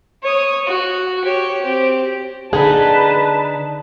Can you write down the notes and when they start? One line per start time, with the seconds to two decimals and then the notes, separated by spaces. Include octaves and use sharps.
0.23 C#5 D#6
0.67 F#4
1.25 G4 C#5
1.62 C4 G4
2.53 D3 D#4 G#4 B4 A5